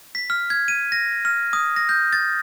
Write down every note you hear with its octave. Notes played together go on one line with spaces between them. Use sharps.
B6
F6
G#6
D#7
A#6
F6
D#6
A#6
G6
A6